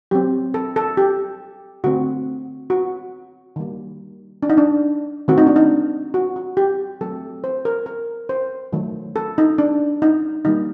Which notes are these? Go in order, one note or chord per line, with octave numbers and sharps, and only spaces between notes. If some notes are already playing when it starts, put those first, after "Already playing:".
F#3 C4 G4
A4
A4
G4
D3 A3 C4 F#4
F#4
D#3 G3 A#3
D4
D#4
D4
D#3 A3 C4 F#4
D#4
D4
D#4
F#4
F#4
G4
F#3 A3 C4 A4
C5
A#4
A#4
C5
D#3 F#3 A3
A4
D#4
D4
D#4
D#3 G3 A#3 D#4